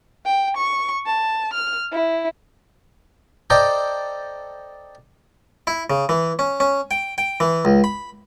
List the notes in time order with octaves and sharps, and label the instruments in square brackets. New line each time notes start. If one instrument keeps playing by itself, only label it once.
[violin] G5
C#6
A5
F6
E4
[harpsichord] A4 C5 D5 D#5 G5 A#5
E4
C#3
E3
C#4
C#4
G5
G5
E3
C#2
B5